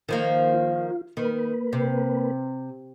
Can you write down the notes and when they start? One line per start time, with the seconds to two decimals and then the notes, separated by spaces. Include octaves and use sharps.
0.09 D#3 F3 A#3
0.54 F4
1.17 D#3 A#3 B4
1.73 C3